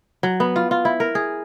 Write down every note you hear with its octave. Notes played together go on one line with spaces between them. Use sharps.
F#3
B3
F4
F4
E4
A#4
G#4